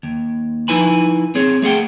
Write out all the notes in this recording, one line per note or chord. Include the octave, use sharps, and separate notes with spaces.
D#2
F3 D#4 E4 B4 G#5 B5
C4 G#4 C#5
A3 G#4 F#5 G5